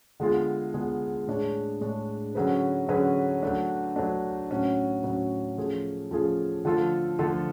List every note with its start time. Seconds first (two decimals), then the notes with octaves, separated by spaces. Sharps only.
0.20 D3 G#3 B3 F4 G#4
0.74 D3 G#3 B3 F4 G#4
1.27 A2 G#3 D4 G#4 C#5
1.81 A2 G#3 D4 G#4 C#5
2.35 D3 F#3 C#4 G#4 B4
2.88 D3 F#3 C#4 G#4 B4
3.43 F#3 A3 D4
3.96 F#3 A3 D4
4.50 A2 F#3 C#4 F#4
5.03 A2 F#3 C#4 F#4
5.58 F3 A3 C#4 F4 G#4
6.11 F3 A3 C#4 F4 G#4
6.65 D3 F3 A3 F4 A4
7.19 D3 F3 A3 F4 A4